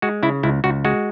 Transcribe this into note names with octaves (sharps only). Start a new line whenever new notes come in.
G#3 F#4
C#3 E4
C#2 E4
C#2 F#4
G#3 F#4